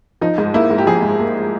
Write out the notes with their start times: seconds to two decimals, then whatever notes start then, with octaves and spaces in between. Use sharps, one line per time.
0.21 F3 D#4
0.38 G#2
0.54 A#3 E4
0.70 G#2
0.78 G4
0.86 F3 G#4
1.02 G#2
1.19 A#3